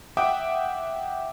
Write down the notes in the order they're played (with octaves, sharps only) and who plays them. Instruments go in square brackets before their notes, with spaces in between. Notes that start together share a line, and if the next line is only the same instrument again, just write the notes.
[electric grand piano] E5 F#5 G5 D6 D#6 D7